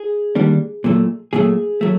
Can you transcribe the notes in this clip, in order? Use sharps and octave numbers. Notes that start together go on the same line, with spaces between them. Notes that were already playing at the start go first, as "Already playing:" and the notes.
Already playing: G#4
D#3 G3 A#3 D4
A#2 F#3 A3
A#2 F#3 A3 G#4
F#3 A3